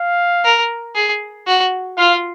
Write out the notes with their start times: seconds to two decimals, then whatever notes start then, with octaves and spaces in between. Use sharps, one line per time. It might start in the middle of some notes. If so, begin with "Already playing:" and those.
Already playing: F5
0.45 A#4
0.95 G#4
1.47 F#4
1.98 F4 F5